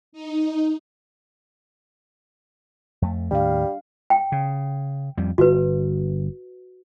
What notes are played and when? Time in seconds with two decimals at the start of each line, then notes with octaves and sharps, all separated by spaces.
0.12 D#4
3.02 F2 A3
3.31 D#2 A2 D#3 G3 D4 F5
4.10 G5
4.32 C#3
5.17 F2 G3
5.38 G1 F#4 B4